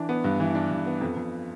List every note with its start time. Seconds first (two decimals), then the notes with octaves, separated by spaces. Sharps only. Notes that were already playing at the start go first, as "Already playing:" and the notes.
Already playing: E3 D4
0.09 B3
0.24 G2
0.40 E3
0.55 D4
0.71 G2
0.86 B3
1.01 F2
1.16 F2